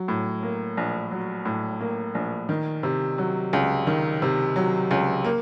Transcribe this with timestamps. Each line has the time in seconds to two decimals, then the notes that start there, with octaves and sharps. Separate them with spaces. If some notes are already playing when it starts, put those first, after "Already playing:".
Already playing: F#3
0.08 A2
0.43 A#3
0.77 A#1
1.11 F#3
1.45 A2
1.80 A#3
2.15 A#1
2.49 D#3
2.83 C3
3.18 F#3
3.53 C#2
3.87 D#3
4.22 C3
4.56 F#3
4.91 C#2
5.25 A#3